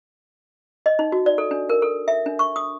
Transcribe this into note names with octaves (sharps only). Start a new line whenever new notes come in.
D#5
D#4
F#4
D5
A4
D4
A#4
A4
E5
D4
C#6
D#6